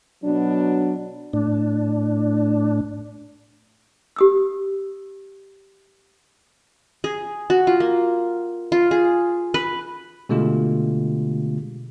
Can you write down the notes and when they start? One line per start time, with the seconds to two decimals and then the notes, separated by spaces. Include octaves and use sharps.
0.24 B2 F#3 D4
1.33 A2 D4
4.16 G4 D#6 E6
7.04 G#4
7.50 F#4
7.67 F4
7.80 A#3
8.72 F4
8.91 G#4
9.54 B4
10.29 B2 D3 G#3 A3 F4 G4